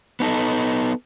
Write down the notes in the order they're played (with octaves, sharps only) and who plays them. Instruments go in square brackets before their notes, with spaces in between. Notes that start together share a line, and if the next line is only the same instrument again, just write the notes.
[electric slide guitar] B3 D#4 A4